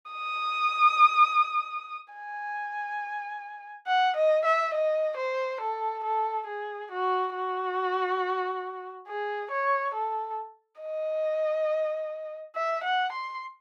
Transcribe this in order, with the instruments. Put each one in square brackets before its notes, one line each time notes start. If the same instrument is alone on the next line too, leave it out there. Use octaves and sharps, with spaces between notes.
[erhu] D#6
G#5
F#5
D#5
E5
D#5
C5
A4
A4
G#4
F#4
F#4
G#4
C#5
A4
D#5
E5
F#5
C6